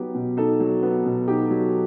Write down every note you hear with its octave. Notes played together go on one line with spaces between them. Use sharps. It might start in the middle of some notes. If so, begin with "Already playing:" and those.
Already playing: F#3 B3 D#4 G4
B2
D#4 A4
F#3
B3
B2
D#4 G4
F#3